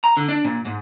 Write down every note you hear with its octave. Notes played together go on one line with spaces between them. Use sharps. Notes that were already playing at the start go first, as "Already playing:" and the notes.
A#5
D3
D4
A#2
G#2